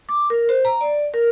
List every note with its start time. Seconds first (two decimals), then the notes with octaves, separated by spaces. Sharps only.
0.09 D6
0.30 A#4
0.49 C5
0.65 A#5
0.81 D5
1.14 A#4